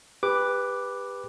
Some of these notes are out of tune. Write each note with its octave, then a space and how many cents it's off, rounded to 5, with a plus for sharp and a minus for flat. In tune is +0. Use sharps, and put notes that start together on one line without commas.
G4 +30 B4 +0 D6 +0